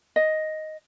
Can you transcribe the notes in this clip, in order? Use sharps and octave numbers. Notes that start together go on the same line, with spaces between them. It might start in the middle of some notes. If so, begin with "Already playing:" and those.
D#5